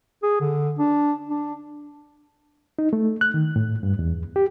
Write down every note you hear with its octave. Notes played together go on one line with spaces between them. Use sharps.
G#4
D3
D4
D4
D#4
A3
F#6
D#3
A2
G2
E2
G4